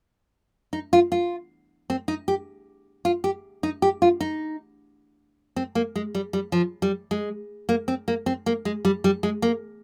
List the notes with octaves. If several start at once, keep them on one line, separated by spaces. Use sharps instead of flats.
D#4
F4
F4
C4
D#4
G4
F4
G4
D#4
G4
F4
D#4
C4
A#3
G#3
G3
G3
F3
G3
G#3
A#3
C4
A#3
C4
A#3
G#3
G3
G3
G#3
A#3